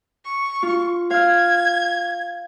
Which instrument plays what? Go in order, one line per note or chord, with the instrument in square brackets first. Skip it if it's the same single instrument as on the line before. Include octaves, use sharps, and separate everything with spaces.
[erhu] C#6
[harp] F4
[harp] F5 F6 [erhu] G#6